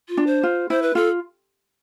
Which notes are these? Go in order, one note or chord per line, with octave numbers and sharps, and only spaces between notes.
F4
D4
C5
F4
E4 C5
B4
F4 A4